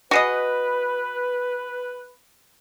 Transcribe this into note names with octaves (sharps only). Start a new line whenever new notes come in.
F#4 G#4 B4 D#5